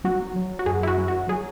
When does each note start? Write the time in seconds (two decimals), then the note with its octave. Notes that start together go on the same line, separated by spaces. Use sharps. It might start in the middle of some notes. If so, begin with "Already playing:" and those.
0.04 F#3 F#4
0.36 F#3
0.59 F#4
0.66 F#2 G#4
0.83 E4
0.87 F#4
0.98 F#3
1.08 F#4
1.28 F#3 G#4